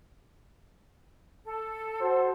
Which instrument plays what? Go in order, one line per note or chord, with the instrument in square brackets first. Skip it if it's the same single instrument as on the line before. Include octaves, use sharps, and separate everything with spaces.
[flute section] A4
[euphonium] F#4 [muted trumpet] C5